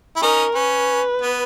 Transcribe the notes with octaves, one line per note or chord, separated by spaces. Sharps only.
E4
C#4 D#4 A#4
C#4 B4
B3